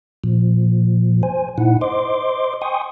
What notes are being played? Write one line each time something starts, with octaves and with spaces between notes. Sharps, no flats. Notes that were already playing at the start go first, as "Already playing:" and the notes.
A#2 F3
C5 G#5
A#2 D#4 E4 F#5
C5 D#5 C6 D6
G5 G#5 C6 C#6 D#6